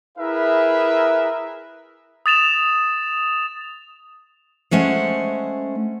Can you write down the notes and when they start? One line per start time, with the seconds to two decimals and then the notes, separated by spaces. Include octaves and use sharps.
0.18 E4 G#4 A#4 B4 E5
2.26 D#6 A6 E7 F7
4.71 G#3 A3 C#4 C5 F#5